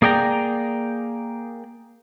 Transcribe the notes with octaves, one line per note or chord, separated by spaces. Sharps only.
A#3 G#4 D5 G5 A#5